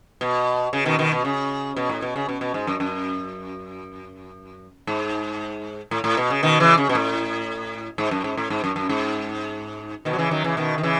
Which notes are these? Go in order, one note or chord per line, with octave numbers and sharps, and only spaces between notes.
B2
C#3
B2 D#3
B2 D#3
B2
C#3
B2
A2
B2
C#3
B2
B2
G#2
F#2
F#2
G#2
A2
A2
B2
C#3
B2 D#3
C#3 E3
C#3
B2
A2
G#2
F#2
G#2
A2
G#2
F#2
F#2
G#2
B2 D#3
F#3
C#3 E3
D#3 F#3
C#3 E3
B2 D#3
D#3
C#3 E3